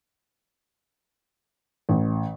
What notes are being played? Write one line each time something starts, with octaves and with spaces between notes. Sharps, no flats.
A1